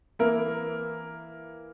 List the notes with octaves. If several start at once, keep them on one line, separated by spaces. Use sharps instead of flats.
E3 A#3 E4 A#4